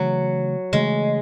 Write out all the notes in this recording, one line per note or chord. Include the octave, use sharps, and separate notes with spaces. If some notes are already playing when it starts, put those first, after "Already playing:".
Already playing: C#3 E3 F#3 A3
C#3 E3 G#3 A3